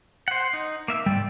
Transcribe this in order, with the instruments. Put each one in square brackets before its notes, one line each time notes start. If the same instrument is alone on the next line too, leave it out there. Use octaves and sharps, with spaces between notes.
[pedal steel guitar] C5 F#5
D#4
A#3 E5 E6
[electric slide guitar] G#2 C3 G3 [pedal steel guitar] D5 G5